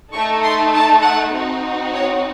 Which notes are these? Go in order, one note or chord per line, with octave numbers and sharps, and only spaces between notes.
A3 D#4 A4 C#6
C6
A5
F#5
C4 D#4 F#4
C#5